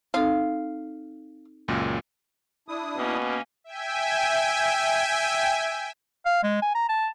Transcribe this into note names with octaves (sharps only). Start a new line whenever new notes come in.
C4 D#4 A4 F5
C#2 F#2 A#2
D4 E4 D#6
B2 A#3 C#4
E5 G5 G#5
F5
G#3
G#5
A#5
A5